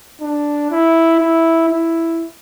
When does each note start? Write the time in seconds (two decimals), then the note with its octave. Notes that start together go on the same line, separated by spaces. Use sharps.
0.21 D4
0.71 E4
1.20 E4
1.69 E4